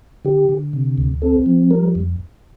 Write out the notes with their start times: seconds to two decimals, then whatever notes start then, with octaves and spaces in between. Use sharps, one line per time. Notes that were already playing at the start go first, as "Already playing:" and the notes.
0.25 D3 G4
0.49 D3
0.73 C3
0.98 D2
1.22 C4 A4
1.46 F3
1.70 G3 A#4
1.95 F2